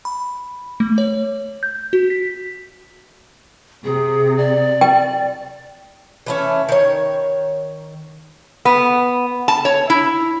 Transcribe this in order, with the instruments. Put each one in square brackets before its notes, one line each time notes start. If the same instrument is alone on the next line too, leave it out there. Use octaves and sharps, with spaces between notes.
[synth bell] B5
A3
C#5
G6
F#4
B6
[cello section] C3 [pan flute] G#4
[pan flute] D5
[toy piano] G5
[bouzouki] E3 A3 C#4
D#3 C#5
[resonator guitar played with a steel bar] B3
A5
C#5
E4